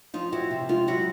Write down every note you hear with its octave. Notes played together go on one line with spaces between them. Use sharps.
F3 D#4 F4
F2 E4 F#4
C3
G#3 D#4 F4
F#3 E4 F#4